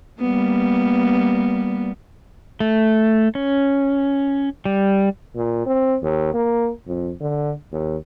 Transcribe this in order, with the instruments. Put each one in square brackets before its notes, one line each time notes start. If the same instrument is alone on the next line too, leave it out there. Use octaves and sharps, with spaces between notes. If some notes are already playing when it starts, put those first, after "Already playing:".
[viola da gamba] G3 A#3 B3
[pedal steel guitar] A3
C#4
G3
[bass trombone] A#2
C4
D#2
A#3
F2
D3
D#2